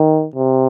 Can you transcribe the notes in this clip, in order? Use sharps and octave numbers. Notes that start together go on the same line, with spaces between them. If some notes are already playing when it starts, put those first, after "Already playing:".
Already playing: D#3
C3